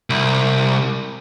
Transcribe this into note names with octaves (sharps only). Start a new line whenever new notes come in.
C2